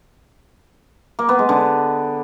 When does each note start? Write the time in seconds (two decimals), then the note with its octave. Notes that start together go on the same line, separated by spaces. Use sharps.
1.19 A#3
1.29 B3
1.39 G#3
1.49 D3